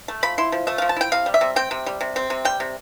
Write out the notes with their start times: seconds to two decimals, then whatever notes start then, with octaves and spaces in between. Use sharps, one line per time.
0.08 A3
0.23 F3 B5
0.38 E4 C6
0.52 F3
0.67 A3 E5
0.78 F5
0.82 F3
0.89 A5
0.96 E4 G5
1.12 C3 F5
1.26 G3
1.34 E5
1.41 C3
1.56 C4 G5
1.71 C3
1.86 G3
2.01 C3
2.16 C4
2.30 C3
2.45 G3 G5
2.60 C3